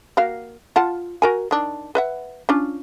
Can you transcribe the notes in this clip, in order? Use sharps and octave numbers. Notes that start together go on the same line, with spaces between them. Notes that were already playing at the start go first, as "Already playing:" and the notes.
A#3 F#4 F5
F4 F#5 A5
F#4 A#4 G#5
D#3 D4
B4 E5 F#5
C#4 D4 F4